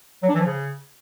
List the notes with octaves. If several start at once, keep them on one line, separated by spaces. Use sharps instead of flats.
F#3
D4
E3
F3
C#3